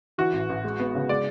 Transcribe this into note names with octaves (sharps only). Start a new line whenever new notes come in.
E3 F#4
A1
A1
G#3
B3
C#3
G#3 D5